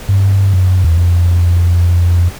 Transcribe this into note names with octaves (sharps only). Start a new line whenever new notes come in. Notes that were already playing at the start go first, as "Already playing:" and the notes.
G2
F#2
E2
F2